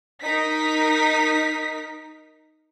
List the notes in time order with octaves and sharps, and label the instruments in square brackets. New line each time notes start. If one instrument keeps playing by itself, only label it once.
[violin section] D#4 A#4 B6